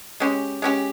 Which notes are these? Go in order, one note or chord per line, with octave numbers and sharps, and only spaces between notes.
G#3 C#4 G4
G#3 C#4 G4